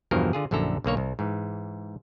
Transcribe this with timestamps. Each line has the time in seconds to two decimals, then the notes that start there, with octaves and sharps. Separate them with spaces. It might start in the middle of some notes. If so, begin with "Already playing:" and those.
0.11 E2 G2 B2 F3 A#4
0.33 D3 F4 G#4
0.51 A#1 F#2 D3 E4 A4 A#5
0.84 B1 D3 A#3 C#5
0.97 C2
1.19 G#2 E3